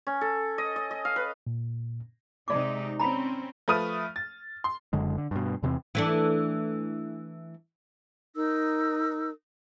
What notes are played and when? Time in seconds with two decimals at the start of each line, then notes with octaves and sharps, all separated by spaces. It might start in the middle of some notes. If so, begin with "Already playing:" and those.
0.07 C#4
0.21 A4
0.58 D#5
0.76 D#5
0.91 D#5
1.05 F5
1.16 B4
1.47 A#2
2.48 C3 G#3 D#4 D5 D6
2.99 C4 C#4 A#5 B5
3.68 F3 A3 B4 D#6 F6 D#7
4.16 A6
4.64 C6
4.93 F#1 F#2 D3 G#3
5.18 D3
5.31 G2 B2
5.63 E2 C3 E3 C4
5.95 E3 A3 D4
8.35 D#4 A#4 E6